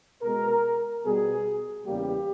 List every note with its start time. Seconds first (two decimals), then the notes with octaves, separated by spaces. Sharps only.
0.22 B2 G#3 B3 A#4
1.04 B2 G3 B3 G#4
1.86 E2 C#3 G3 A#3 G4